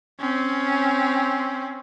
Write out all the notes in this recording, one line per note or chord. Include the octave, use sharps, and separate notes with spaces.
C4 C#4